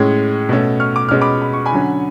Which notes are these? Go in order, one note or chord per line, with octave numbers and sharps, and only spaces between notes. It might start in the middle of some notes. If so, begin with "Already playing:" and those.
Already playing: A2 G#3 C#4 G#6
B2 A3 C#4
C#6 F6
D6
B2 G#3 C#4 F6
B5 D6
B5
C#6
G#5 B5
D3 F#3 C#4